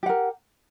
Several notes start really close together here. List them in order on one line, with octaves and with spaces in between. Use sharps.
G4 F#5 A#4